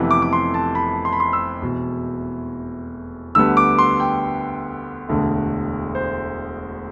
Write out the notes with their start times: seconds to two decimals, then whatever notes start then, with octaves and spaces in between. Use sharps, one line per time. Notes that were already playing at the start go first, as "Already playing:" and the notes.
Already playing: F1 F2 C3 E3 B3
0.11 D6
0.22 D6
0.33 C6
0.54 A5
0.75 B5
1.05 C6
1.13 B5
1.20 C6
1.33 E6
1.62 E1 E2 B2
3.35 D2 D3 G3 B3 E6
3.57 D6
3.79 C6
4.00 G5
5.09 E1 D2 D3
5.95 C5